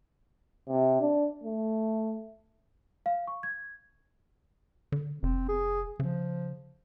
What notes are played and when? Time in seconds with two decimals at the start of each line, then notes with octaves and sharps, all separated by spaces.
0.68 C3
1.01 D4
1.44 A3
3.06 F5
3.27 C#6
3.43 G#6
4.92 D3
5.23 F1 C4
5.49 G#4
6.00 C#3 F3